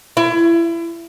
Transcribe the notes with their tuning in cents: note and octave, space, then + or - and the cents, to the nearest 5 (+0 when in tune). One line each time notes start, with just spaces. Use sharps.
E4 +30